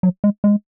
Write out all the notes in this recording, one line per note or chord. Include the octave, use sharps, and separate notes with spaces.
F#3
G#3
G#3